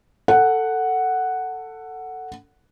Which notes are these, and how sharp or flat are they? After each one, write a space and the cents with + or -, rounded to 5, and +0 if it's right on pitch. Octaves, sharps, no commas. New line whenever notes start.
A4 +15 F#5 +0